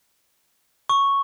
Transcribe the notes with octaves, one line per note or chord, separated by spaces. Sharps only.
C#6